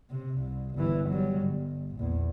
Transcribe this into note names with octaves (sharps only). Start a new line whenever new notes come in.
C3
C2
G1 E3
F#3 G3
G1
A#1 E2